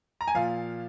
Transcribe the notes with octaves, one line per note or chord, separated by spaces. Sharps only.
A#5
G#5
A#2 F3 F5